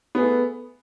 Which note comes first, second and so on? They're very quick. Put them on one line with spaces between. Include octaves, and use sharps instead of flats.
B3 G#4 A3